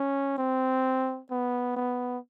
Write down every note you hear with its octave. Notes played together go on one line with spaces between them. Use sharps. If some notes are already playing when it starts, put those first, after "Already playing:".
Already playing: C#4
C4
B3
B3